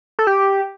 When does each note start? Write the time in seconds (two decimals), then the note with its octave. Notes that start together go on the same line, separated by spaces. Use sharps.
0.19 A4
0.27 G4